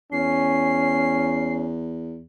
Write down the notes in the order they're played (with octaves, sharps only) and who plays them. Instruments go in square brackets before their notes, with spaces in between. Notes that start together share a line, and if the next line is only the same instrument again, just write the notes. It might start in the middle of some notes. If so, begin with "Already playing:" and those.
[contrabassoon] E2 [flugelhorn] C#4 [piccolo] C7